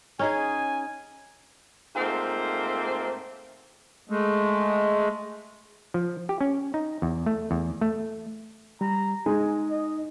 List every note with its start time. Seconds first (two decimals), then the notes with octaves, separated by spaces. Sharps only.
0.19 C#4 D#4 G#4 G#5
1.96 G#2 A3 A#3 C4 F4 C5
4.09 G#3 A3
5.94 F3
6.29 G4
6.41 C#4
6.74 D#4
7.02 E2
7.26 A3
7.51 E2
7.81 A3
8.81 G3 A#5
9.26 G#3 D#4 G#5
9.71 D#5